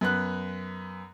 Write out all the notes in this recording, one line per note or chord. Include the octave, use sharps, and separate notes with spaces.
F#2 B3 F#6